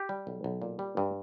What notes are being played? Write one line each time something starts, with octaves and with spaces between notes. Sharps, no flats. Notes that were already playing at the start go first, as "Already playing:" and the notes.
Already playing: G4
G3
B1
B1
A#2
G3
G2